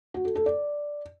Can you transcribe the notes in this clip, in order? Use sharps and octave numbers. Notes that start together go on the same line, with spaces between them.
F#4
A4
A4
D5